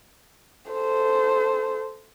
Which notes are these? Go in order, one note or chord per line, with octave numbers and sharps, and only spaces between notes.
A4 C5